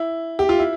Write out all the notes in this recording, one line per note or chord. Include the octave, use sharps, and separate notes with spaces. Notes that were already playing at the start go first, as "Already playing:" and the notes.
Already playing: E4
G4
F4
E4